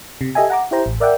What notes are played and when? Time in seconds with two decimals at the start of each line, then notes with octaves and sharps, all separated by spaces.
0.21 C3
0.35 G4 A4 D#5 E5 G#5
0.50 F#5 A#5 D6
0.71 E4 G4 C5 A#5
0.86 A1
1.00 A#4 D5 E5 F#5 G5